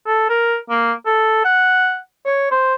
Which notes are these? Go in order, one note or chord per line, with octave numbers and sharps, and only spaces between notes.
A4
A#4
A#3
A4
F#5
C#5
C5